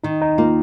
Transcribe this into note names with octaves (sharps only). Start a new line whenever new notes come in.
D#3 D#4
D#4
A#3 F4